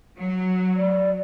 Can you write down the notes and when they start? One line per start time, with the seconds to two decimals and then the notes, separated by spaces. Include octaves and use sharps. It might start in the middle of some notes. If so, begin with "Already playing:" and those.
0.16 F#3
0.77 D5